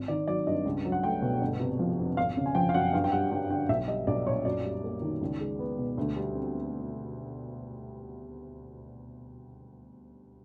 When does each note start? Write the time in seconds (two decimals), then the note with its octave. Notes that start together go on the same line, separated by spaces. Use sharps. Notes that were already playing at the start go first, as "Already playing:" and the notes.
Already playing: G#1
0.08 D#3 D5
0.28 F#3 D5
0.47 G2 D#5
0.65 C#2
0.85 F#3
0.92 F#5
1.03 A3 G5
1.22 B2
1.41 G1
1.60 C3
1.79 F3
1.99 F2
2.17 G#1 F5
2.37 C#3
2.46 G#5
2.55 F3 G5
2.69 F5
2.74 F#2 F#5
2.93 G2 F5
3.04 G5
3.12 G3 F#5
3.32 G2 G5
3.50 D3 G5
3.69 B1 E5
3.88 G3 D#5
4.07 B1 D5
4.26 A#2 C#5
4.45 F#2 D5
4.65 G3
4.84 A#3
5.02 D#3
5.21 C#2
5.40 G#3
5.59 B3
5.78 B2
5.97 D2
6.16 G3
6.34 C4